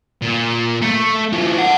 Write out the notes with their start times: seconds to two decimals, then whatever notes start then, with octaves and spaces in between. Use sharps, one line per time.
0.22 A#2
0.82 A3
1.33 E3 F4
1.58 D5 F#5